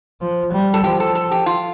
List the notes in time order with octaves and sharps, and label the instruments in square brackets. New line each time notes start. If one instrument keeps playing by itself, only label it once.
[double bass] F3
G3
[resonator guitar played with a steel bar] A4
[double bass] F3 [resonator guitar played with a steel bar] G4
[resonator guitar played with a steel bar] A4
A4
G4
F4